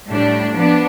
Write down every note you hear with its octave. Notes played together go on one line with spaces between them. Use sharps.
A2 G3 D4
F3 B3 D4